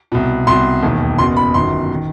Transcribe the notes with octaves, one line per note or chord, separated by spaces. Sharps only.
C2 B2
C2 B2 C6
E1 D#2 D#3
F#1 E2 B2 C6
B5
G1 F#2 D#3 C6
D#3